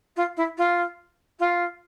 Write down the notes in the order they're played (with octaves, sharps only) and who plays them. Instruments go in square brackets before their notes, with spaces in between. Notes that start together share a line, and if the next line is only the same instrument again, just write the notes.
[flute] F4
E4
F4
F4